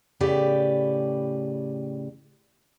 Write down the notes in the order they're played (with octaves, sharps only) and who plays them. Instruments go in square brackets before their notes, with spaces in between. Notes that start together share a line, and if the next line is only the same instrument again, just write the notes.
[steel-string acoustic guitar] A2 C#3 G4 B4 D5 G5